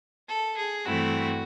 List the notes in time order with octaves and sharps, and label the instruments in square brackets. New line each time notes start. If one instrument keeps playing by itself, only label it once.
[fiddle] A4
G#4
[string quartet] G2 E3 A3 C4 E4 [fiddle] F#4